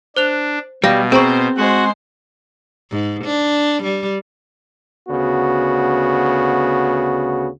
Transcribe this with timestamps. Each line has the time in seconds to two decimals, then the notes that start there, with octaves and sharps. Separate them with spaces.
0.17 D4 C5 F#6 F7
0.84 B2 G3 F5 A#6
1.12 C4 G#4 C5 A#5 C#6
1.57 G#3 F#4 C5 F#5 C6
2.91 G#2
3.25 D4
3.83 G3
5.09 D2 C#3 B3 F#4